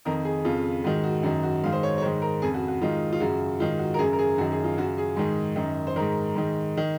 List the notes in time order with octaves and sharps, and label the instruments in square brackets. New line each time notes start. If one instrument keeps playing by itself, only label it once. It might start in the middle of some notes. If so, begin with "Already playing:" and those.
[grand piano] F2 D#3 A#4
G#4
F2 C#3 F4
G#2 D#3 F#4
F#4
F#2 D#3 F#4
F#4
G#2 D#3 F5
C5
C#5
C#5
G#2 C5
D#3
A#4
F2 C#3 G#4
F#4
F#4
G#2 D#3 F4
F4
F#2 C#3 F#4
G#2 D#3 F4
F#4
A#4
F#2 C#3 G#4
A#4
G#4
F#2 F#4
D#3
G#4
F4
F#2 C#3 F#4
G#4
G#2 D#3
F#2 D#3
C5
G#2 D#3 A#4
G#2 D#3
D#3